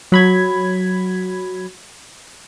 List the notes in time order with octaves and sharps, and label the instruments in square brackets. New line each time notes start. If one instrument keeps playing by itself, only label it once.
[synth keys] F#3 B5 G#6